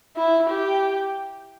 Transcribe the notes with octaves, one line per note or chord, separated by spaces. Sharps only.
E4
G4